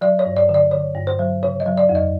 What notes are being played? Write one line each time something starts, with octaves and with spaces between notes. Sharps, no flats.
F#3 D5
C#5
G2
D5
D3
D5
D3 C#5
G2
C5
F#3
C#3 C#5
D#5
F#3
D5
F2
D#5